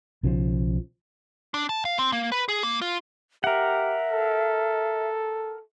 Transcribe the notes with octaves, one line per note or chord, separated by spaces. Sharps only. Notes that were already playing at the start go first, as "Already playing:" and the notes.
B1 C#3 E3 F3
D4
A5
F5
C4
A#3
B4
G#4
A#3
F4
G4 A#4 E5 F#5
A4